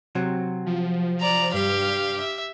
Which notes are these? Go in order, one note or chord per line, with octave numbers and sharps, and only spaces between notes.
C3 F#3 C4
F3
D5 A#5
G2 G4 F5
E5